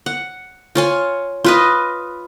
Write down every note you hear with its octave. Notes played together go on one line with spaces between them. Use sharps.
F#5
F4 C#5 G#5
F4 B4 D#5